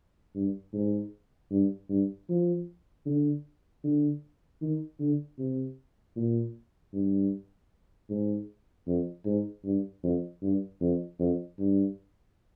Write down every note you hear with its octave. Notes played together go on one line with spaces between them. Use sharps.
G2
G#2
G2
G2
F3
D3
D3
D#3
D3
C3
A#2
G2
G#2
F2
G#2
G2
F2
G2
F2
F2
G2